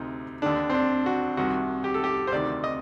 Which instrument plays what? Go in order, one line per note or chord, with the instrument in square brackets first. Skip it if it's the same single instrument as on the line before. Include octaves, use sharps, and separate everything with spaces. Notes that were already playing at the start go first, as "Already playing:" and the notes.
Already playing: [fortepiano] D2 C3 D#4
D#2 D3 D4
C4
D4
F#4
C2 C3 D#3 F#4
G4
A4
G4
C5
D2 C3 D#3 D5
D#5